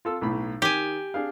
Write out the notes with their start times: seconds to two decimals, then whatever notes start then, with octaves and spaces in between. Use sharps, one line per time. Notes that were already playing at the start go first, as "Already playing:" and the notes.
0.05 F4 A4 E6
0.21 B1 A2 B5
0.62 D#3 G4 G#5
1.14 D4 G#4 F5